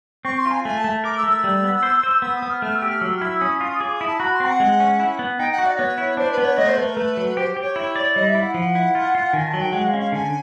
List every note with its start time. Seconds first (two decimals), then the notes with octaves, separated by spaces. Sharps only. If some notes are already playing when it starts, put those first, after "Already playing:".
0.25 C4 C#6
0.39 C6
0.46 F4
0.51 G#5
0.64 A3 G#5
0.78 A5
0.84 A3
1.04 A#4 D6
1.17 E6
1.23 A3
1.30 E6
1.44 G3
1.64 B3
1.83 C5
2.03 C5
2.22 B3 E6
2.36 D#6
2.42 B3
2.50 F6
2.62 A3 F6
2.75 E6
2.82 G4
2.88 F6
3.01 F#3 E6
3.17 F6
3.21 E4 E6
3.41 C#4 D#6
3.61 F4
3.80 G#4 D6
3.93 D#6
4.01 E4
4.08 A5
4.20 F#4 B5
4.34 C6
4.40 C4
4.46 F#5
4.60 G#3
4.80 C#4
5.00 E4
5.19 B3
5.39 D#4 G5
5.52 F#5
5.58 F#4
5.66 D5
5.78 B3 C#5
5.98 E4
6.17 D4 C5
6.32 B4
6.38 B3
6.44 C#5
6.57 A3 D#5
6.67 C5
6.78 A3 B4
6.87 A#4
6.96 A3 B4
7.17 F#3
7.37 G4 C5
7.57 G4
7.62 C#5
7.76 E4
7.96 D5
8.16 G3 D#5
8.28 E5
8.35 E4
8.42 F#5
8.54 F3
8.75 E4
8.95 F4
9.15 F4
9.33 D#3 G#5
9.47 A5
9.54 F#3
9.61 G5
9.73 G#3 F#5
9.87 F5
9.94 C#4
9.99 F5
10.12 D3 G#5